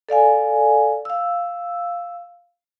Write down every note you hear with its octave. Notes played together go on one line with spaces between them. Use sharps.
A4 D5 F5 G#5
F5 E6